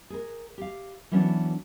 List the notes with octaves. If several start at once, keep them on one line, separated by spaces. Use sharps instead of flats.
G#4 A#4
G4 F5
E3 F#3 B3 C#4 D4 F#4